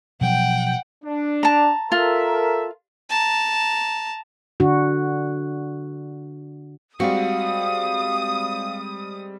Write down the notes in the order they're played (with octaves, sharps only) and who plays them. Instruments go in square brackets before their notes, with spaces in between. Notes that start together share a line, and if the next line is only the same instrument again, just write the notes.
[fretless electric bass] B2 F3 F#3 [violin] F#5 G5
[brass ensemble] D4
[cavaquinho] A5 A#5
[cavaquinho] F4 [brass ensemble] A4 A#4 E5
[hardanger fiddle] A5 A#5
[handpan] D3 D4 F#4
[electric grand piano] G3 G#3 C4 [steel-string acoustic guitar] F#4 [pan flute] F5 [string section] D#6